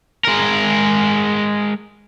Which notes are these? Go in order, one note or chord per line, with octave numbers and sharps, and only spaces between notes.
G#3 A#4